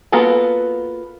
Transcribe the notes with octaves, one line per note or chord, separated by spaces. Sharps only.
A#3 B3 F4 F#4 A4